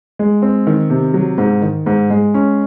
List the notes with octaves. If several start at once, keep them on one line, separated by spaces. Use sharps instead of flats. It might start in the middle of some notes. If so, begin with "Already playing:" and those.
G#3
C4
D#3
C3
F#3
G#2
D#3
G#2
G#3
C#4